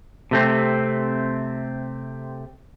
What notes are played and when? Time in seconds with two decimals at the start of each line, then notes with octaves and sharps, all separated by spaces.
0.31 C3 A3 C4